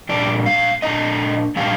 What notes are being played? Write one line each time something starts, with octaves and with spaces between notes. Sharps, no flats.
A#2 G3 D4 D5
F5
A#2 G3 D4 D#5
A#2 G3 D4 F5